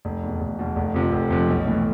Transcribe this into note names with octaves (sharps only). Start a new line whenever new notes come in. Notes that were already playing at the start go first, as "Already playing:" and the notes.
F1
E2 B2
F1
E2 B2
F1
F2 C3 F3
F1
F2 C3 F3
B1
A2 E3 A3